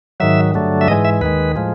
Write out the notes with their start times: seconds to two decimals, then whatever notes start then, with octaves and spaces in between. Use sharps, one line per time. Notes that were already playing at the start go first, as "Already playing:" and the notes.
0.20 G#2 D#3 F#3 E5
0.54 G2 D3 F#3 A3
0.81 E5
0.88 G#2 E3 G#3 D#5
1.05 E5
1.21 D#2 D#3 G#3 B4
1.56 A2 F3 G#3